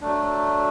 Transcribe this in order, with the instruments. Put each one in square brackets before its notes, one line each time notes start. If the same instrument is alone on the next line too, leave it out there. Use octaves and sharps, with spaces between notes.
[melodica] F#3 A3 D4